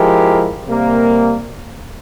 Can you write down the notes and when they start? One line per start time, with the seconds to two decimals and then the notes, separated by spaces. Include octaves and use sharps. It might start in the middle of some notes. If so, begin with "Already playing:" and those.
Already playing: F3 G#3 E4 G4 A#4
0.66 C3 G3 A#3